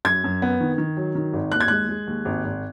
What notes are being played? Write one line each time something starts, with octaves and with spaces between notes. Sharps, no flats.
F#2 G#6
F#2
B3
D#3
D#3
F#3
D#3
G#1
D#2 F#6
G#6
G#3 F#6
G#3
D#2
G#1
G#1